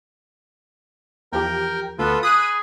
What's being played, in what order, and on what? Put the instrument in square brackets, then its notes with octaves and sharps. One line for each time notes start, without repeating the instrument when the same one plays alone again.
[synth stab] E2 F3 G4 [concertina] A#4 G5
[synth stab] D2 [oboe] B3 [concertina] F4 A4 B4
[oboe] G#4 [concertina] B5 [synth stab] D#6 F#6 D#7